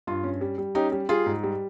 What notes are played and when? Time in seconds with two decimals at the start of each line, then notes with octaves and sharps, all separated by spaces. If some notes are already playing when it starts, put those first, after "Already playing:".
0.07 G2 F4
0.24 C#4
0.41 G3
0.58 G3
0.75 C#4 D#4 G4
0.92 G3
1.09 G3 F4 G#4
1.26 G#2
1.43 G3